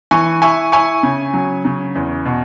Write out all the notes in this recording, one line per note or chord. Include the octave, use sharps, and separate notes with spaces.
E3 G#5 C#6
E4 G#5 C#6
E4 G#5 C#6
C#3
F#3
C#3
E2
B2